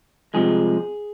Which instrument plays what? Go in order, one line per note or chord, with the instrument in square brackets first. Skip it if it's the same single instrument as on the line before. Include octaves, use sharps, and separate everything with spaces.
[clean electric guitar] C2 C3 F3 G#3 G#4